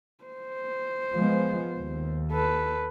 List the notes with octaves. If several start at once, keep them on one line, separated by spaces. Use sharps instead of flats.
C5
F3 G#3 B3
D#2
A4 B4